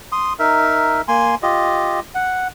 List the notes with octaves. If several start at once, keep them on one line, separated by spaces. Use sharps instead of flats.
C6 D#6
D#4 A#4 E5
A#3 G#5 C6
F4 G4 D#5
F#5